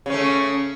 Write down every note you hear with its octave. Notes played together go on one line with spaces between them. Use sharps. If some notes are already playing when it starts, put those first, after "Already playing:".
C#3 A3 C#4